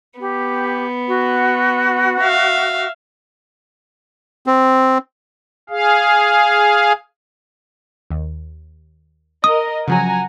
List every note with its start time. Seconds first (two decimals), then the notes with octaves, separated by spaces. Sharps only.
0.20 B3 G4
1.07 F#4
2.20 E5 F5
4.47 C4
5.70 G#4 F5
8.11 D#2
9.44 A#4 D#5 D#6
9.88 C#3 F3 F#3 F#5 G#5 A#5